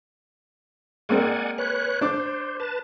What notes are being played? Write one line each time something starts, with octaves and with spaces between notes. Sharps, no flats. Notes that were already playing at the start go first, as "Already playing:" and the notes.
G#3 A#3 C4 D5 F#5 G#5
B4 C#5 F#6
D4 C5 D6
B4 A5